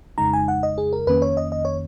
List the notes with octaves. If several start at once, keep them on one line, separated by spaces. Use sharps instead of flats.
F2 C#3 G#3 D#4 A#5
G#5
F#5
D#5
G#4
A#4
F2 D#3 A#3 C#4 B4
C#5
D#5
D#5
C#5